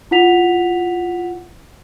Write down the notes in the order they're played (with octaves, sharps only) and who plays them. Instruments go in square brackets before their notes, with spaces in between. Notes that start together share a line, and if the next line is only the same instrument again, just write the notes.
[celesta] E4 F4 F#5 B6 F7